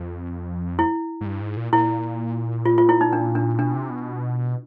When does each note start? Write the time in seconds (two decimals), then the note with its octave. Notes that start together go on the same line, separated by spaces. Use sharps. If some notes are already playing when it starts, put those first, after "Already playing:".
Already playing: F2
0.79 E4
1.21 G#2
1.26 G2
1.41 G#2
1.57 A#2
1.73 A#2 E4
2.65 F4
2.78 F4
2.89 E4
3.01 D#4
3.13 D4
3.35 D4
3.59 B2 D4
3.75 C3
3.90 B2